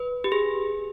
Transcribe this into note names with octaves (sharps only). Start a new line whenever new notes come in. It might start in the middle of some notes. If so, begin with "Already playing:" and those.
Already playing: B4
G4
G#4